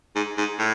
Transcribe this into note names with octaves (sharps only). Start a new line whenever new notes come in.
G#2
G#2
A2